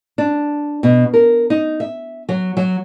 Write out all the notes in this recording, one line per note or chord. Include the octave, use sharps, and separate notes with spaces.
D4
B2
A#4
D#4
E5
F#3
F#3